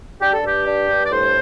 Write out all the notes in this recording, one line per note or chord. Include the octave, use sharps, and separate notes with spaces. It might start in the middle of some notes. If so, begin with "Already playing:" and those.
D4 G4
A4
G2 G4
D4
G2
D5
A2 C5